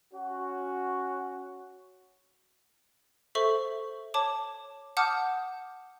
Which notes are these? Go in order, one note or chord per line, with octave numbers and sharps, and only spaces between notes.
C#4 F#4
A4 C5 E5 C#6
C#5 A5 D6
F#5 A5 D6 D#6 F6 G6